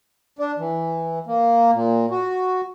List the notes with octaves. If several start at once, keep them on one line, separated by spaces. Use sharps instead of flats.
D4
E3
A#3
A#2
F#4